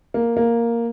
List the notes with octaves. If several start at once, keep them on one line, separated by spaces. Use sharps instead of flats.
A#3
A#3